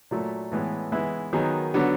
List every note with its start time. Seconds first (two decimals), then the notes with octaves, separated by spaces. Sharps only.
0.11 A#2 F#3 A3
0.52 A2 E3 G#3 B3
0.92 E3 G#3 B3 E4
1.33 D#3 F#3 B3 D#4 G#4
1.74 D3 F#3 B3 D4